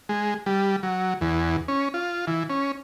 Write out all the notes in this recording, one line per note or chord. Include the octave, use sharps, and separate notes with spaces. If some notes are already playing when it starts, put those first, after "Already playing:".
G#3
G3
F#3
E2
C#4
F4
E3
C#4